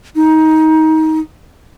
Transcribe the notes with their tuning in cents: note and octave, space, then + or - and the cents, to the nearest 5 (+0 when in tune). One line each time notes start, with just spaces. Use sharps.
D#4 +20